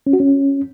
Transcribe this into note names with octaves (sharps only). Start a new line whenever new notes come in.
C#4
F#4
C#4